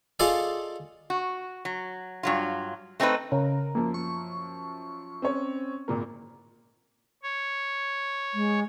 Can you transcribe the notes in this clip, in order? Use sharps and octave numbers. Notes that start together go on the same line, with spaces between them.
F4 G#4 A4 D5 D#5 F5
F#4
F#3
G2 F#3 F4
A3 C4 D#4 G#4 B4
C#3 A#4
F#2 F3 A#3
C#6
C4 C#4 C#5
G#1 A#2 A#4
C#5
G#3